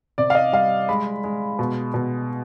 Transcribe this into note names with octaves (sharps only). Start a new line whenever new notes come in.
C3 D5
F5
D#5
G3 F5
G#3 B5
G#3
B2
B2